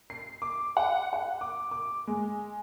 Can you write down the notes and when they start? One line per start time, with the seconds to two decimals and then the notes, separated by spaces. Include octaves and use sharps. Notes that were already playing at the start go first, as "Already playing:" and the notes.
0.10 C7
0.42 D6
0.77 F#5
1.13 F#5
1.41 D6
1.71 D6
2.07 G#3